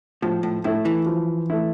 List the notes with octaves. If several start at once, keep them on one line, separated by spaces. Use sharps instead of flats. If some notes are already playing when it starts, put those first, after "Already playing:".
A2 F3
A2
A2 A3 E4
E3
F3
A3 E4